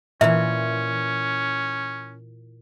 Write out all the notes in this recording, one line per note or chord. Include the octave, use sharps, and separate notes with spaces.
A#2 E3 C#4 E5